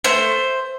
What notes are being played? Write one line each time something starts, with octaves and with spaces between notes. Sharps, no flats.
A3 C5